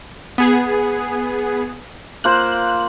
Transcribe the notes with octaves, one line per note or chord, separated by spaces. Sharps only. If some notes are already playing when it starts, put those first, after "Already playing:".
B3 G#4
A#3 F4 C5 F#6